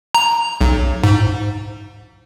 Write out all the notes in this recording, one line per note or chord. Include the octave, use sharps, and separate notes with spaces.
A#5
B1
G#2